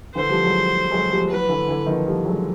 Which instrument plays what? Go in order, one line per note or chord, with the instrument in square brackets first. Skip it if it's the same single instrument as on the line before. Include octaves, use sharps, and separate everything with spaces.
[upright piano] D3 E3 [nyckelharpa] C5
[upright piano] F3 G3
F#3 G#3
F#3 G#3
F3 G3
[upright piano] E3 F#3 [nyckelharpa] B4
[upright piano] D3 E3
D3 E3
D#3 F3
F3 G3
F#3 G#3